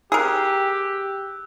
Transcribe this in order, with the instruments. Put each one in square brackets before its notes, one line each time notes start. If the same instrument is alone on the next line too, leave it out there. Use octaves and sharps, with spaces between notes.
[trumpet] G4 [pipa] G#4 A#4 [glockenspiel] E6 F#6